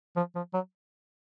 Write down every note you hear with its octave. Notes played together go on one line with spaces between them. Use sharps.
F3
F3
F#3